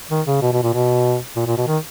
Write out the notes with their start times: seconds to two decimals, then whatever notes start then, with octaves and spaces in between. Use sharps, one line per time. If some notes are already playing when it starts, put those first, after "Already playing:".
0.11 D#3
0.27 C#3
0.42 B2
0.53 B2
0.63 A#2
0.74 B2
1.36 A#2
1.47 A#2
1.58 B2
1.67 D#3